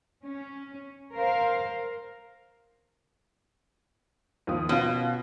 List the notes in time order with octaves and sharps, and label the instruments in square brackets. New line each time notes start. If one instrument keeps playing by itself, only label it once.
[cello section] C#4
A#4 C5 F5
[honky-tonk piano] D#2 F3 D#6
[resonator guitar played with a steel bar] B2 [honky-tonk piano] B3 C#4 F4